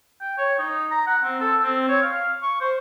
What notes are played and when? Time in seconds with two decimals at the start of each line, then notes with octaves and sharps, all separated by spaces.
0.21 G5
0.38 C#5
0.59 D#4
0.91 A#5
1.07 F#5
1.24 C4
1.41 A4
1.63 C4
1.89 C#5
2.02 F5
2.42 C#6
2.61 C5